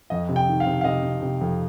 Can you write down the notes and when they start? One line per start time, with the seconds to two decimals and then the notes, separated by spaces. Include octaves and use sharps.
0.10 F2 D#5
0.29 C3
0.36 G5
0.48 D#3
0.60 F5
0.66 C3
0.81 F5
0.84 C3 D#5
1.03 C3
1.22 C3
1.41 F2